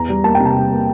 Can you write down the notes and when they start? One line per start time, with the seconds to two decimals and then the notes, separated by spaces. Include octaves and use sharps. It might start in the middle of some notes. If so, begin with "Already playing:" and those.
Already playing: E2 A#5
0.09 G3
0.24 A#3 A5
0.35 G5
0.40 C3
0.45 A5
0.56 G3
0.72 A#3